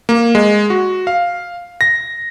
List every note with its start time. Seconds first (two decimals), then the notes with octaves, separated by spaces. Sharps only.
0.09 A#3
0.35 G#3
0.70 F#4
1.07 F5
1.81 A#6